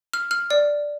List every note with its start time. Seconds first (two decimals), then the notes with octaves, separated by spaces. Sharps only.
0.14 F6
0.31 F6
0.51 D5